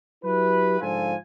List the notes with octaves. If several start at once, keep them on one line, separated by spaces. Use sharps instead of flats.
F#3 E4 G4 B4
G#2 D3 F3 F4 A4 G#5